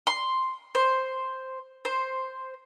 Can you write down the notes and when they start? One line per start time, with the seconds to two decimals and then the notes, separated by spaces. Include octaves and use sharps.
0.07 C6
0.75 C5
1.85 C5